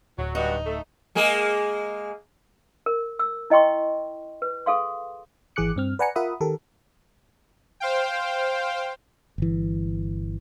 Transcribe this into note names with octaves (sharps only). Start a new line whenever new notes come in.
D1 F#3
G2 D#4 F#4
A3
G#3 A#3 G#4
A#4
E6
E4 D#5 G5 C6 C#6
B4
G#4 A4 F5 C6
G#1 E3 G#4 D6 F#6 C#7
G2 C4 F6
B4 D5 F#5 G#5 A#5 C#7
F4 A#4 E5 F#5 B5 D#6
D#3 G4 A4 A#4
C5 F5 G5
G1 E3